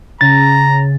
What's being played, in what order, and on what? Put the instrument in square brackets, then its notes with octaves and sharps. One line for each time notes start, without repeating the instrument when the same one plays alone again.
[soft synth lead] C#3 [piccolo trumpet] A#5 [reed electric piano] A6